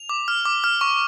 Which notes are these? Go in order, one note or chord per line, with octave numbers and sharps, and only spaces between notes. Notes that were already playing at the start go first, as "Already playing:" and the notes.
Already playing: F7
D6
F6
D6
F6
C#6